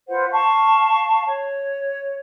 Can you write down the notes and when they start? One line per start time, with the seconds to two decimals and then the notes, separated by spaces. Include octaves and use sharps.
0.08 F4 B4 C5 F#5
0.31 F5 A5 C#6
1.26 C#5